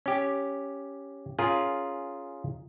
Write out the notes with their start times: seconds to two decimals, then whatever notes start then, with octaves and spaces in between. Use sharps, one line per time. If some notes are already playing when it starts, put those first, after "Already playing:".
0.06 C#4 G4
1.38 C#4 F4 G#4 A#4